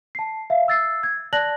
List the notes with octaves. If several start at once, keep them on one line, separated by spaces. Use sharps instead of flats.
A5 C7
E5 F5
E6 A6 C7
G#6
D5 A5 F#6 A#6 F#7